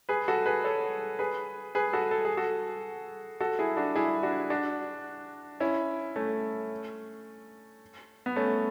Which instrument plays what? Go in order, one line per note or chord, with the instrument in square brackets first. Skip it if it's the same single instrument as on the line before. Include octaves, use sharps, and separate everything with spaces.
[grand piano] G#4 B4
F#4 A4
G#4 B4
A4 C#5
G#4 B4
G#4 B4
F#4 A4
A4
G#4
F#4 A4
F#4 A4
E4 G#4
D4 F#4
E4 G#4
D4 F#4
D4 F#4
C#4 E4
A3 C#4
B3
A3 C#4